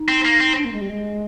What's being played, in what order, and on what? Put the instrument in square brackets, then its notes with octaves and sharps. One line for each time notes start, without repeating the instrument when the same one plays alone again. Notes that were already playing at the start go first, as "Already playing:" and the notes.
Already playing: [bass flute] D#4
[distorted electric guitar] C4
A#3
C4
[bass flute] D4
A#3
G#3
G3
G#3